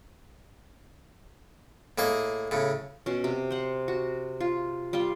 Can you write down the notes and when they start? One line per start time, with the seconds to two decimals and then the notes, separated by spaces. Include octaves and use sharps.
1.98 A2 A#3 G#4 D#5
2.51 A2 C#3
3.06 B2 C#4
3.24 C3
3.51 C5 F#5
3.88 F#4
4.40 F4
4.93 G3 F4 C6